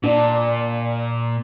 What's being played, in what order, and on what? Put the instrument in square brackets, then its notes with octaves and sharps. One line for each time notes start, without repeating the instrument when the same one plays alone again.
[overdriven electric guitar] A#2 [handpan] D4